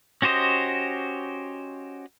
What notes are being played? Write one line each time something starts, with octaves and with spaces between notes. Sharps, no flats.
C#4 F#4 G4 C5 D#5